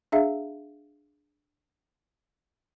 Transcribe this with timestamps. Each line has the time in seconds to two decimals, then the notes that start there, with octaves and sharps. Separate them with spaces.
0.12 D4 G#4 E5 F5